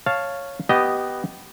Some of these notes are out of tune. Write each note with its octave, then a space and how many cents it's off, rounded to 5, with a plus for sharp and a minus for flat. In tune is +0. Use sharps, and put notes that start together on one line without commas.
C#5 +0 F5 +0 A5 +0
B3 +0 G4 -15 D#5 +0